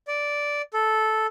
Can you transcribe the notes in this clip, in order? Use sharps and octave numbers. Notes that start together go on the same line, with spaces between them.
D5
A4